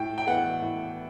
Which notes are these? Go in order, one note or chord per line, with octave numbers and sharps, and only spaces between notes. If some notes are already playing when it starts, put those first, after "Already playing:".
Already playing: A2 G5
G5
E3 B3 F#5
A2